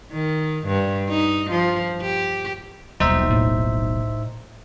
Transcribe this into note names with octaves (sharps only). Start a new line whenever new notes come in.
D#3
G2
D#4
F3
G4
D#1 B1 D#4 C5 E5
A2